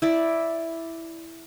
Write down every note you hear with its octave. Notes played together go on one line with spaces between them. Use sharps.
E4 D5